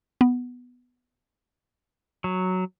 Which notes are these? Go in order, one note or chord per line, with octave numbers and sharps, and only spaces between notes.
B3
F#3